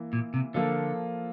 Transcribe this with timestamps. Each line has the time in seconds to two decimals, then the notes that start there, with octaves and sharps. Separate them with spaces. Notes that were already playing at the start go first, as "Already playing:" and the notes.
Already playing: E3 A#3
0.13 A#2
0.34 C3
0.54 D3 F3 A#3 F4 A4